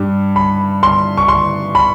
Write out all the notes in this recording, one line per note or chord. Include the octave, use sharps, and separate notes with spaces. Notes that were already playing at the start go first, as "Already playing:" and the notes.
Already playing: G2 G3
B5
C6
C#6
C6
B5